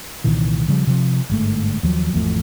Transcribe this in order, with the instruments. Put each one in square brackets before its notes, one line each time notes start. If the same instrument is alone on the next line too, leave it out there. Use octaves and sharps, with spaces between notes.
[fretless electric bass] C2 A#2 D#3 E3
C#3 F3 G3
C3 F3
G1 G#2 A3
D#2 F3 F#3
G#1 E2 F3 A3